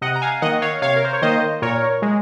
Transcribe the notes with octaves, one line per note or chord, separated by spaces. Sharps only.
C3 D#5 F#5
A#5
F5 G#5
D#3 A#3 D#5 F#5
C#5 F5
C3 C#5 F5
A#4
C5
C#5
D#3 A#3 C5 D#5
A#2 A#4 C#5
G#3